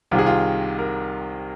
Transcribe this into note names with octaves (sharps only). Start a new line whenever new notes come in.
C2 C3 D#3 F4
G#4
F4
A#4